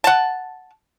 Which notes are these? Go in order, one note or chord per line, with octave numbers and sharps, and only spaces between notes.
F#5 A5